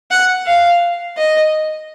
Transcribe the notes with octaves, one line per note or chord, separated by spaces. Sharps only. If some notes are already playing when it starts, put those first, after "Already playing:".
F#5
F5
D#5